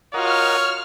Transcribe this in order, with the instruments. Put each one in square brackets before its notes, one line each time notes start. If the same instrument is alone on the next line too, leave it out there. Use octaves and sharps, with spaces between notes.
[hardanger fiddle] F4 F#4 [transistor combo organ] A#4 D#5 F#5 [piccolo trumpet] C#5 [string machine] F6